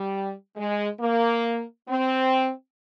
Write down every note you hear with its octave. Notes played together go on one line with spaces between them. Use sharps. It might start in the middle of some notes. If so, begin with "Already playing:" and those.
Already playing: G3
G#3
A#3
C4